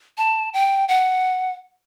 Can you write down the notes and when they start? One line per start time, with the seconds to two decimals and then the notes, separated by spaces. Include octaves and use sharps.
0.18 A5
0.53 G5
0.88 F#5